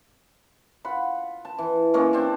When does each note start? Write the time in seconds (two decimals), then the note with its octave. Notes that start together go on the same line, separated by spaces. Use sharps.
0.84 F4 F#5 B5
1.45 A5
1.58 E3
1.94 G#3 A#3 C#4 A4
2.13 C4 D4 A5